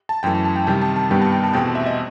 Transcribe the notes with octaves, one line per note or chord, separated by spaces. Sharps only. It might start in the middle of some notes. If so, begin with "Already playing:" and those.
A5
F#2 E3 A3 G5
A5
A5
G5
C3 D#3 G3 G5
A5
A5
G2 D#3 G3 B3 G5
A5
G5
A5
E2 B2 A3 C4 G5
E5
D#5